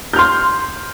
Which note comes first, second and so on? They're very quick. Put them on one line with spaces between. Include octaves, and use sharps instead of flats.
G6 F6 C6